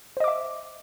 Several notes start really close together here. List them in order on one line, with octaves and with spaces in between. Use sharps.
C5 D#5 D6 E5